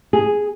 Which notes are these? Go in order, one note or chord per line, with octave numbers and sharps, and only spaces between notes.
G#4